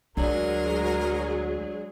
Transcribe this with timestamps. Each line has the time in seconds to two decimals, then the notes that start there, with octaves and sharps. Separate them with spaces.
0.17 D2 F#3 G#3 D4 G#4 A#4 C#5 D5